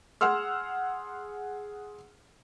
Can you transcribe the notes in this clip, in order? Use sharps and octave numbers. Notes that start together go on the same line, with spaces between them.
G#4 F#5 C6 E6 F6